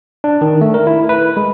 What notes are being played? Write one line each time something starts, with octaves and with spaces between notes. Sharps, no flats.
D4
D#3
A3
A#4
E4
B4
G#3